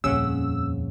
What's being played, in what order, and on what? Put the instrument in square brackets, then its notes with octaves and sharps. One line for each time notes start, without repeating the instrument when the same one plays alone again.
[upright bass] D#1 F2 [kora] C#3 C#4 F#5 [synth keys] E6